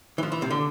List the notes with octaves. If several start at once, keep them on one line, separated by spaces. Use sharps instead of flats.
E3
F3
E3
C3
D3